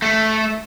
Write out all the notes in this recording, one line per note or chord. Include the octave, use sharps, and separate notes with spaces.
A3